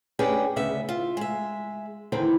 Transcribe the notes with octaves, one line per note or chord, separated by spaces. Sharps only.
C#4 D4 G4 G#4 B4 G5
D2 C#3 B3 E5
F4
G#3 E5
E2 D3 D#3 C4 E4